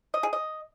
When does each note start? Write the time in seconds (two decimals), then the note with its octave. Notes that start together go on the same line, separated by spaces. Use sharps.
0.14 D#5
0.23 G#4
0.33 D#5